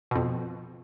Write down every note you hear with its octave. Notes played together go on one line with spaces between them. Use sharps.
F2 B2